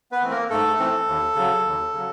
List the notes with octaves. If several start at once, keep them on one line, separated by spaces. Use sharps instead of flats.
B3 B4
E3 A3 C4
A#3 A#4
G#2 A3 A4
E3 A3 C4
D#2
C#3 F#3
D#2
C#3 F#3